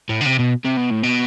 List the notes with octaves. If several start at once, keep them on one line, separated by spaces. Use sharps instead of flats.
A2
D3
C3
B2
C3
B2
A2
B2